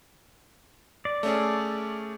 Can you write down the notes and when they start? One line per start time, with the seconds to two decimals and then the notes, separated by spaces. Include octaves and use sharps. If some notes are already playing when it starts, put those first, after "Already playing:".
1.05 D5
1.23 A3 C#4 G#4